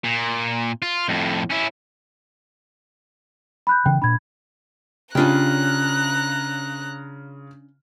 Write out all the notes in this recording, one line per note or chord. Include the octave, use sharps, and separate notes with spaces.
A#2
F4
F2 A2
C#4 E4
B5 F#6 G6
C#3 E3 G5
A#2 D4 B5 G#6
C#3 C#4 D4 F4 G4 A#5 F#6